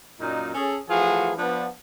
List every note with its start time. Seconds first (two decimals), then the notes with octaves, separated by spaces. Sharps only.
0.20 F#2 A#2 D#4
0.54 C#4 G#4 A4
0.89 E3 F3 A3 F4 F#4 G#4
1.37 F3 B3 D4